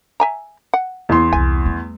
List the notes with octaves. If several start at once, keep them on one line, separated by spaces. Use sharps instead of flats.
E5 G#5 A#5
F#5
E2 C6
C2 G3 G#5
G3 A3